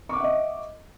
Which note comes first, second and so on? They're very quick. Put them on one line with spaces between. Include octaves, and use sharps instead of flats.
C#6 D6 F#5 E5 D#5